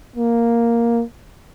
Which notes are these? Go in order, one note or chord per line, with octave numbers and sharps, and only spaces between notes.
A#3